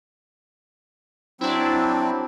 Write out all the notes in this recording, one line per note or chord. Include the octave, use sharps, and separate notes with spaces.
F#3 C4 D4 E4